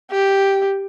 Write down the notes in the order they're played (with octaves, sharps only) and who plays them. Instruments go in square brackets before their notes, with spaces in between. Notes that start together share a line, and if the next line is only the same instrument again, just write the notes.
[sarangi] G4